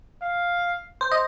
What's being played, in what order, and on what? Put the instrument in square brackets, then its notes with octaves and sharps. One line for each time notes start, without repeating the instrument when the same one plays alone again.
[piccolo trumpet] F5
[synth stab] C5
D#5